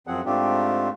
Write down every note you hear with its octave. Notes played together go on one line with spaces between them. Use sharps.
F#2 F3 C4 G#4 F#5
G#2 A3 C4 D4 F4 G4